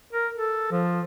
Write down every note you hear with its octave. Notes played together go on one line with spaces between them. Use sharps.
A#4
A4
F3